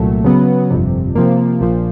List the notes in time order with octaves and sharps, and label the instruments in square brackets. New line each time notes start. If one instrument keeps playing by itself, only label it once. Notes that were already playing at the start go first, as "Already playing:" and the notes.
Already playing: [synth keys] C2 A#2 F#3 A3
C#3 F#3 B3
G1 F2 C3
C3 F3 A#3
A#1 A#2 F3